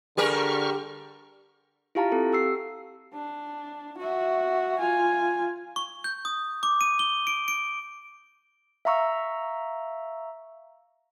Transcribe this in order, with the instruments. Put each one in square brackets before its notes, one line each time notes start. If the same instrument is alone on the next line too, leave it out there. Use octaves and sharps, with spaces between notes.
[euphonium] D3 [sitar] G3 G4 A#4 [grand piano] G#4 [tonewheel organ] C#6 F6
[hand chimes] E4 F4 G4 F5 A5 A#5
C4 A4
G4 E6 C7
[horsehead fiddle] D4
F#4 E5
F4 G#5
[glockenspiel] C#6
G6
D#6
D6
D#7
G7
D7
D7
[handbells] E5 F5 A#5 C#6 E6